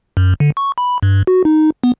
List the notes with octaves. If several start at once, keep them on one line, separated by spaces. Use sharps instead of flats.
F#2
D3
C#6
B5
G2
F#4
D#4
B3